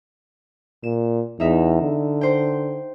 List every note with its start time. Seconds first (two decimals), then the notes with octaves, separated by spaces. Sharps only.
0.83 A#2 E7
1.40 E2 D#4 E5
1.82 D3
2.21 C5 G5